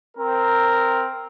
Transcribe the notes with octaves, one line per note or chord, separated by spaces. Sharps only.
C4 A#4